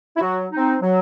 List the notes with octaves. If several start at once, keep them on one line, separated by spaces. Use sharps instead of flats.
E4
F#3 F#4
C4 D#4
F#3